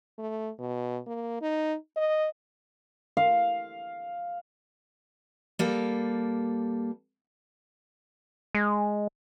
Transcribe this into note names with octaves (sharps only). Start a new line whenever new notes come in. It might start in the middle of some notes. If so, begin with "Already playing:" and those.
A3
B2
A#3
D#4
D#5
F5
G3 A#3 A4
G#3